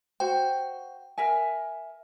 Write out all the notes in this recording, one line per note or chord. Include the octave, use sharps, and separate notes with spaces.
F#4 C5 G5
A#4 E5 G#5